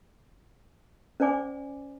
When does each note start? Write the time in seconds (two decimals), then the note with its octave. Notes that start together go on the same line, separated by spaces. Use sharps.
1.20 C#4 C5 D5 G#5 D6